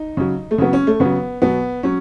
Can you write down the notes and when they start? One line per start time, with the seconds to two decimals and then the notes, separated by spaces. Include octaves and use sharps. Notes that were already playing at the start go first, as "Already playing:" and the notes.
Already playing: D#4
0.17 C#3 F#3
0.51 A3
0.58 C#3 F#3 B3
0.73 C#4
0.87 A3
1.00 C#3 F#3 B3
1.42 B2 F#3 B3
1.83 F#3 C#4